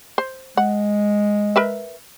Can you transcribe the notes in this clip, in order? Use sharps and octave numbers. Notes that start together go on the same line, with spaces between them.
C5
G#3 F#5
A#4 B4 E5